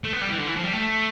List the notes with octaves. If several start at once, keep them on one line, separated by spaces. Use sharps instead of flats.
A3
B3
G3
E3
D3
E3
F3
G3
A3